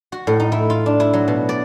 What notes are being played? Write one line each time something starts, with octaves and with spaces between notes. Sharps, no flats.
F#4
A2
D#4
E4
F4
D4
E4
F#3
B2
D5